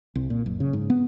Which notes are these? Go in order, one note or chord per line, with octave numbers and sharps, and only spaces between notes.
C2
A#2
F#1
C#3
G#2
B3